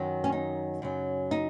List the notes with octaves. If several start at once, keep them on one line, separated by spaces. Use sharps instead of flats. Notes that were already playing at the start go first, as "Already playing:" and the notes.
Already playing: F#2 D#3 F#3
C#4
D#4
F#2 C#3 F#3
D#4